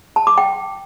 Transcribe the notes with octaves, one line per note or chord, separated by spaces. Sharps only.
A5
D6
G5